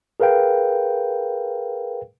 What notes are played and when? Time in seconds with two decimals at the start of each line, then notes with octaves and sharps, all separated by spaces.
0.20 G#4 A#4 B4 F5 G5